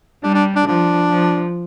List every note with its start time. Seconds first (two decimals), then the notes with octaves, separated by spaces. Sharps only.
0.23 G3 D4
0.34 D4
0.56 D4
0.66 F3 D4
1.09 F3